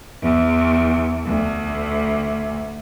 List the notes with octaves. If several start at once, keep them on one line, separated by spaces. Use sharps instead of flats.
E2
D2